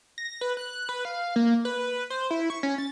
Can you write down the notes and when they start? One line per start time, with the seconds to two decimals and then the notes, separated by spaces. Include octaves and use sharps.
0.18 A#6
0.41 B4
0.57 F#6
0.89 B4
1.05 F5
1.36 A#3
1.65 B4
2.10 C5
2.31 E4
2.50 C#6
2.63 C#4
2.78 A6